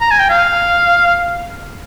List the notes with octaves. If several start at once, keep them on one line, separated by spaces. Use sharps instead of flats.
A#5
G#5
G5
F5